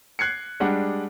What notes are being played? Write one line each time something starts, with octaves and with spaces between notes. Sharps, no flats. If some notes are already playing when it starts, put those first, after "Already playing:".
F#6 G#6 C7 C#7
G3 G#3 D4 F#5